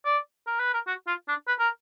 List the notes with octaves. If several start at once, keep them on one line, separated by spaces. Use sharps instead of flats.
D5
A#4
B4
A#4
F#4
F4
D4
B4
A#4